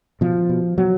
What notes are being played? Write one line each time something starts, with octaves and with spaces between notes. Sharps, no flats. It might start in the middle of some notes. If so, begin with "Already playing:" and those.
B2 F3
B2
B2 F#3